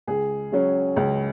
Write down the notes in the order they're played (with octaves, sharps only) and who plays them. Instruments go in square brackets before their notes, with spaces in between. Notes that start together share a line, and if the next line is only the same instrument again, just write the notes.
[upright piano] C#2 G#4
C#3 F#3 C#4
C#2